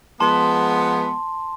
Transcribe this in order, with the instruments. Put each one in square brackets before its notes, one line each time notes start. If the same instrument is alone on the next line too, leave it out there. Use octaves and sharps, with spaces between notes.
[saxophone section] F3 G#3 B3 [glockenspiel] A5 C6